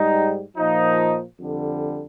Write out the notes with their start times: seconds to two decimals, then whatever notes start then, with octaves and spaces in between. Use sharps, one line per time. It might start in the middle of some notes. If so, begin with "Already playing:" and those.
Already playing: G#2 G3 D#4
0.57 A#2 F3 D#4
1.38 F2 D3 G3